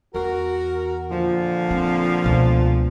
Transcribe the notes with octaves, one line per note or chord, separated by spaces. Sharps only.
E2 F#4 A#4
A#2 D3 F3
C4
C#2 B2